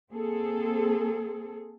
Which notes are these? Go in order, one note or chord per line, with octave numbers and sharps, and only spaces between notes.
A#3 C4 G#4 A4